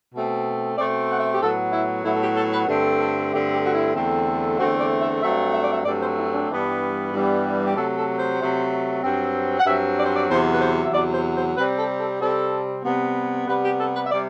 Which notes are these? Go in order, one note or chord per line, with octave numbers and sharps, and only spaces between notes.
B2 A3 C4
B2 A3 C4 D5
F#5
E5
G4
A2 F#3 B3 A4
E4
A2 F#3 B3 E4
A4
G4
A4
B4
G2 D3 A3 C4 A4
A4
G2 D3 A3 C4 G4
G4
F#4
E4
E2 D3 A3 C4
E2 D3 A3 C4 F#4
D5
E5
G2 F#3 A3 C4 E5
E5
D5
E5
G2 F#3 A3 C4 D5
C5
E4
D4
G2 E3 G3 B3
G2 E3 G3 B3
G4
C3 F#3 A3 A4
A4
C5
C3 F#3 A3
G2 F#3 C4
F#5
G2 F#3 C4 E5
D5
C5
D5
E2 C3 F#3 C5
B4
C5
E5
E2 C3 F#3 D5
C5
C5
C3 G3 C4 B4
A4
A4
C3 G3 C4 A4
C3 G3 B3
C3 G3 B3 B4
G4
A4
B4
E5
C3 G3 D5